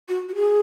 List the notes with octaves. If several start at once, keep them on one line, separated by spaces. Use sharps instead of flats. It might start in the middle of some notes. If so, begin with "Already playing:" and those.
F#4
F#4
G#4